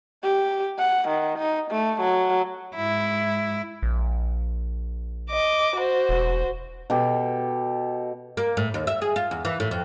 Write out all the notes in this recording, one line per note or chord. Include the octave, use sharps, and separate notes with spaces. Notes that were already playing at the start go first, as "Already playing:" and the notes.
G4
F#5
D#3
D#4
A3
F#3
G#2 E4
A#1
D#5 D6
F#4 C5
E1
B2 G4 A4
A#3
A2
D#2
E5
G#4
F4
E2
E3
A2
F2